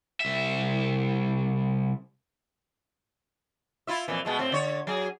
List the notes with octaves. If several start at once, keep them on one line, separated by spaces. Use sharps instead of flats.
C2 E5
E4 F4 E5
F2 A#2 E3
B2 G#3 A3
A2 C4
D3 C#5
F#3 G#4